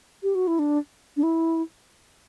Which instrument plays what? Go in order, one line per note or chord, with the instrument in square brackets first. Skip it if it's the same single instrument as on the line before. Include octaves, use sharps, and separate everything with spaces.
[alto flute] G4
F#4
E4
D4
D4
E4